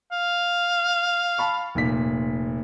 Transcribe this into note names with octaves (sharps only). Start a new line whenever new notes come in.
F5
A5 B5 C#6
F1 A#2 B6